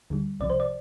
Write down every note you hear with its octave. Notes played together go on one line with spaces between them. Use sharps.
D2 D3 G3
C2 C3 F3 D5
C5
D5